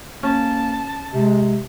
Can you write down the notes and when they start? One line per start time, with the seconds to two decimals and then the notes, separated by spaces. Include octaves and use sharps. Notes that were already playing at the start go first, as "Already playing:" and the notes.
0.23 A#3 C#4 A5
1.14 C3 G#3